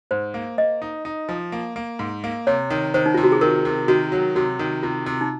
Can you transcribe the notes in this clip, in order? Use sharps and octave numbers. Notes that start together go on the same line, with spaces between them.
G#2 C5
A#3
A#3 D#5
D#4
D#4
F3
A#3
A#3
G#2
A#3
C3 C#5
D#3
D#3 C5
D#4
C3 F4
F#4
G#4
D#3 A#4
C3
D#3 F#4
F#3
C3 F#4
D#3
C3 F4
C3
D#4